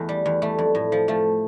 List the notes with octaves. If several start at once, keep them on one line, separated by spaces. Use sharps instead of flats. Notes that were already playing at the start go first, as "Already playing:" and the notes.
Already playing: E2 A3
G3
E2
G3 A3
F2
A2
F3
F3 A3